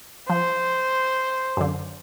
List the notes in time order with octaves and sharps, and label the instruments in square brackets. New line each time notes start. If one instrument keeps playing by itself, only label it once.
[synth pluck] F3 [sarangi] C5
[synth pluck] F#2 D3